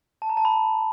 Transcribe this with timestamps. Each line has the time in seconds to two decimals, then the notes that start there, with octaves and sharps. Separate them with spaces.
0.22 A5
0.29 A#5
0.37 A5
0.45 B5